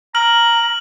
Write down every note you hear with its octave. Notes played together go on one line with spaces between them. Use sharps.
A#5 F6 F#7